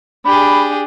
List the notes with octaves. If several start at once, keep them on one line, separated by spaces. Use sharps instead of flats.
D4 G4 G#4 B5